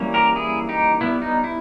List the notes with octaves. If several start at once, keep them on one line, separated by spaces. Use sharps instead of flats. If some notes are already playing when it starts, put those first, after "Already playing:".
Already playing: E3 G3 A#3 C#4
G4 A#4
E4 G#4
D#4 G4
G3 B3 E4
D#4
E4